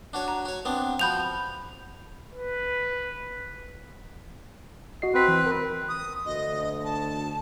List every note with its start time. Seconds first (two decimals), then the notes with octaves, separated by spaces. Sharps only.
0.13 D4 F#4 C#5
0.28 A#5
0.45 F#4 C#5
0.65 B3 C4 D4
0.99 F3 F#4 B5 G6 F7
2.33 B4
5.02 F#4 D#5 C7
5.14 C4 F#4 B4 B6
5.28 E3
5.46 A#4
5.89 D#6
6.26 D2 D#5
6.84 A5